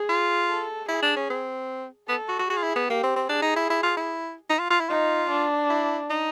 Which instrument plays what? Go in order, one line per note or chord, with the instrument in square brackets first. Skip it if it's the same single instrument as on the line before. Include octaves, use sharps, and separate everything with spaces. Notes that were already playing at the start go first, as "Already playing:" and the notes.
Already playing: [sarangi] G#4
[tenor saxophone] F4
[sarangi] A4
[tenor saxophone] E4 [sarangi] G#4
[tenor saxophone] D4
C#4
C4
[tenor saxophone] B3 [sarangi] A4
[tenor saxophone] F#4
F#4
[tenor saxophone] F#4 [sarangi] G#4
[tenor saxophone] F4
E4
B3
[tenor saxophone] A#3 [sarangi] G4
[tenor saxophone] C4
C4
[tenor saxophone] D4 [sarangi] G#4
[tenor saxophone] D#4
E4
E4
F4
E4
D#4
F4
F4
E4
[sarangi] D#4 [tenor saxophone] F4
[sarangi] D4
[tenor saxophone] E4
D#4